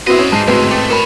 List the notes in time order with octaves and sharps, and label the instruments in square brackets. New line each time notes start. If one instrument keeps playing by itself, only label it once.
[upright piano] B3 C4 E4 [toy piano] F#4 [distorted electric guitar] C5 D#5
[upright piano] C#4
[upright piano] G#2 C7 [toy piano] A5
[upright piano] A1 G#2 C4 [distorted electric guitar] D2 G#3 [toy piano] F#4 B4
[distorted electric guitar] A3 [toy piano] G5 D6 D#6
[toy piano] A#4 B5 [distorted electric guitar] C#5 A5